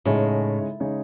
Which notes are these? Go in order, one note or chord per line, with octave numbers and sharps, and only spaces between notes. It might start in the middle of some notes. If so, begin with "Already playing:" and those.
A2 C#3 G#3 D#4 G#4 C#5
C#3 G#3 D#4 G#4 C#5